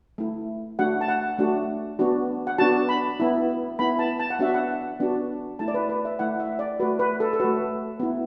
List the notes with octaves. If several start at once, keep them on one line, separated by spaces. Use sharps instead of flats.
A3 E4
A3 D4 F#4 F#5
A5
F#5
A3 D4 F#4
B3 D4 F#4
F#5
B3 D4 F#4 A5
B5
B3 E4
B3 E4 B5
A5
A5
F#5
B3 D4 F#4 E5
F#5
B3 D4 F#4
A3 E4 A5
D5
B4
B4
E5
A3 E4 F#5
E5
D5
A3 F#4 B4
B4
A4
A4
A3 F#4 B4
B3 E4